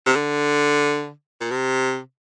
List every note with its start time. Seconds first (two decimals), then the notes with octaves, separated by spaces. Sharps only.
0.06 C3
0.16 D3
1.41 A#2
1.51 C3